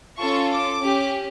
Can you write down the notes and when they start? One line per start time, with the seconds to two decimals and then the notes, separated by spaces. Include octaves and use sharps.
0.18 C#4 F4 A4 C#6
0.50 D6
0.81 C#4 G4